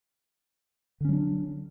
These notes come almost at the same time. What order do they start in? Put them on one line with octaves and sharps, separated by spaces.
D3 C#4 F#3 D4